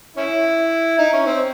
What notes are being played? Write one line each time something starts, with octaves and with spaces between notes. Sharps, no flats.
C#4 E4
D#4
C#4
C4